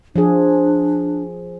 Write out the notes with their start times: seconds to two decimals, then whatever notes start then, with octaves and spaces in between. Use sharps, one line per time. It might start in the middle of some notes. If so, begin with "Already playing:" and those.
0.16 F3 D4 G#4